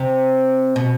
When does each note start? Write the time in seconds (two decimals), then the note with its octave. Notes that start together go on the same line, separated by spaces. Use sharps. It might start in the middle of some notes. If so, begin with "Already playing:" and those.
Already playing: C3
0.76 B2